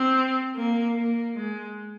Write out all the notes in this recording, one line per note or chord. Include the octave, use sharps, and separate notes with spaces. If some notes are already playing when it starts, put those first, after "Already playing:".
Already playing: C4
A#3
A#3
G#3